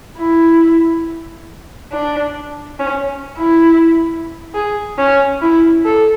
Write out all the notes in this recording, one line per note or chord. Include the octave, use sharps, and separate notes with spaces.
E4
D4
C#4
E4
G#4
C#4
E4
A4